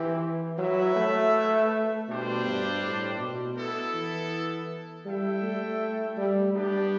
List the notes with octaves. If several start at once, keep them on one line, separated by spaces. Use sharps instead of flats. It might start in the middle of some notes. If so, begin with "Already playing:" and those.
Already playing: E3 C4 E4 G4
F#3 E4 B4 E5
A3
B2 G3 D4 G4 C5
G2
A2
B2
B3 E4 A4
E3
G3 E4 A4 E5 G5
A3
G3
G3 B3 D4 G4